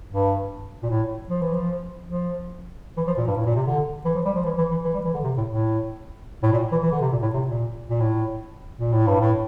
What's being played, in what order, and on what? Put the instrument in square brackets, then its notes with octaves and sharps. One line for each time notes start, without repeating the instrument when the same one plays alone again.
[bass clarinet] G2
A#2
A2
F3
E3
F3
F3
E3
F3
A#2
G2
A2
A#2
C3
D3
E3
F3
G3
F3
E3
E3
E3
E3
G3
E3
D3
C3
A2
A2
A2
A#2
E3
E3
D3
C3
A#2
A2
C3
A#2
A#2
A2
A#2
A2
G2
A2